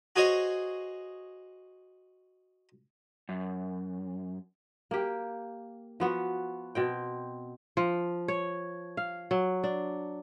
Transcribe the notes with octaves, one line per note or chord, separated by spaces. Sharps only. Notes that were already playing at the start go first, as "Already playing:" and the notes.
F#4 G#4 C5 C#5 D#5
F#2
A#3 G4
F3 B3 F#4
B2 C4 G5
F3
C#5
F5
F#3
D4